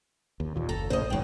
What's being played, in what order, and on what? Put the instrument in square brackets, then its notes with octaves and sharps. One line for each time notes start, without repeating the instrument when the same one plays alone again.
[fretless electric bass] D#2
D#2 A#2
[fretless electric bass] F#1 [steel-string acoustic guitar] A4 A#5
[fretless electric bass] A#1 A2 C#3 [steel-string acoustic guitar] C5 D#5
[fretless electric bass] E1 G#2 D#3 [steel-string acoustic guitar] F#3 G5